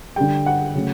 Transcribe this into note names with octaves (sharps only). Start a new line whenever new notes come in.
D3 G3 G5
F#5
C#3 F#3 A3